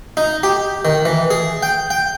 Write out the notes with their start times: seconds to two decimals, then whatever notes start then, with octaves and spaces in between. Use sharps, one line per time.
0.17 D#4
0.43 G4
0.85 D#3
1.05 E3
1.31 G#4
1.63 G5
1.90 G5